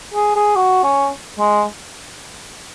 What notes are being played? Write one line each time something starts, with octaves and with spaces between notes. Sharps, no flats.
G#4
G#4
F#4
C#4
G#3